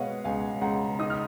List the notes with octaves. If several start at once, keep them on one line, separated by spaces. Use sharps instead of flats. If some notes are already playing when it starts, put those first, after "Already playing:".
Already playing: B2 G#3 B4 C#5 D#5 F5 F#5
C#2 F5 G#5
C#2 F#5 A#5
D#4 D#6
F6